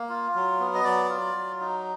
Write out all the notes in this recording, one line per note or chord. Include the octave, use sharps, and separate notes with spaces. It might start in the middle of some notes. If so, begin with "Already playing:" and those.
Already playing: A#3
F4
F#3
B3
D#5
F#3 D5
F4
F#3
D#4